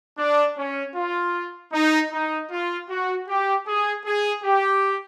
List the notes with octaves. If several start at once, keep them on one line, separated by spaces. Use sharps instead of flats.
D4
C#4
F4
D#4
D#4
F4
F#4
G4
G#4
G#4
G4